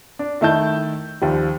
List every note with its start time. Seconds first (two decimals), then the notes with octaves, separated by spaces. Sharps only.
0.19 D4
0.41 D#3 A3 E4 D#5 A5 G6
1.21 D#2 F3 G3